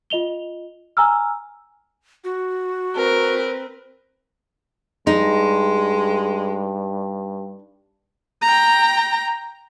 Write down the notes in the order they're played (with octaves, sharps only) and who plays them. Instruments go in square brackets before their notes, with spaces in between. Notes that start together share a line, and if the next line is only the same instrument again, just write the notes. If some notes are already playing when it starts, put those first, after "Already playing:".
[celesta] F4 D#5 F7 G7
G#5 A#5 E6 F6
[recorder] F#4
[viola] C4 B4 [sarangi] A#4
[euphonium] G2 [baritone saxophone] G#3 [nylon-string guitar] D#4
[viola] G5 A#5